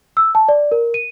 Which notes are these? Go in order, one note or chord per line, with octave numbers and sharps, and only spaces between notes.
E6
A5
D5
A#4
D#7